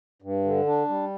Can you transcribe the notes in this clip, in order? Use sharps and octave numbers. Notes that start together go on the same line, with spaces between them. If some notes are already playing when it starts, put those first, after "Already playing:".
G2
D3
D4
G3